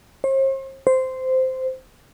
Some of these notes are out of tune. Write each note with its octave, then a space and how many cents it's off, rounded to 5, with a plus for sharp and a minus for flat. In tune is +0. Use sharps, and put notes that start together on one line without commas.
C5 +45
C5 -10